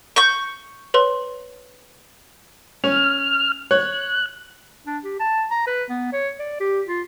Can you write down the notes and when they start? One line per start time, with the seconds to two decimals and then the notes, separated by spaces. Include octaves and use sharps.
0.16 C#6 G6
0.94 B4 C#5 C6
2.84 C#4 F6
3.71 C#5 F#6
4.86 D4
5.04 G4
5.20 A5
5.51 A#5
5.67 B4
5.90 B3
6.13 C#5
6.39 D5
6.60 G4
6.87 F4